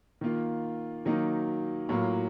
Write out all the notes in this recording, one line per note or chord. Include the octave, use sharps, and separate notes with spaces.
D#3 A#3 F4
D#3 F#3 A#3 D#4
A2 F#3 A#3 F4